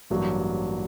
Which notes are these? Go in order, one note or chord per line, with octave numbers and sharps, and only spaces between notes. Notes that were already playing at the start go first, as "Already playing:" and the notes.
A1 G2 F#3 A#3